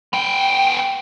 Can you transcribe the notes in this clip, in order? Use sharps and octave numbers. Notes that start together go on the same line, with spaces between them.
B3 G5